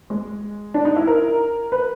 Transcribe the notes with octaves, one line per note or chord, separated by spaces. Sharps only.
G#3
D4
D#4
E4
A#4
B4